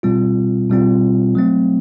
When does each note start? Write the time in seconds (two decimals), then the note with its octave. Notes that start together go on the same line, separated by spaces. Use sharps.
0.03 B2 G3 C4 F4
0.69 B2 G3 C4 F4
1.35 F#3 A3 C4